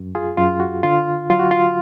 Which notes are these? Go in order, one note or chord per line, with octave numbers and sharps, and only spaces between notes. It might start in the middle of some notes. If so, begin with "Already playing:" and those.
Already playing: F#2
F4 G#4
F#2 F4
F#4
D3 F4
F#3 F4
F#4
F4